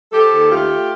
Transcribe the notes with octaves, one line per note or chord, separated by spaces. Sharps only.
F3 G4 A4
D#2
A3 F4 G4
A3